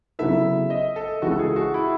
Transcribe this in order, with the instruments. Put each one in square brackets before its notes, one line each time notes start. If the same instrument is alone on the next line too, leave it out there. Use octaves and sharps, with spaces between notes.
[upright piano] C#3 F#3 B3 E4 A4 [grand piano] E5
[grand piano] D#5
A4
[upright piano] C#2 C#3 E3 G#3 [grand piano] F#4
[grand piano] A4
G#4
F#4
E4